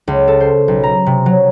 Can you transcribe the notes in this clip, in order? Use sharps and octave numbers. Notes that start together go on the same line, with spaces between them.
C#2
A4
C5
B1
A#5
C3
F#3